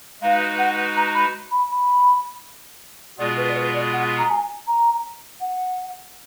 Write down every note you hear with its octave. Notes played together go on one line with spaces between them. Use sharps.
G#3 D#4 F#4 B4 F5
F#5
A#5
B5
B5
B5
B2 G#3 B3 F4 G#4 D5
B4
D5
B4
D5
F#5
A#5
G#5
A#5
F#5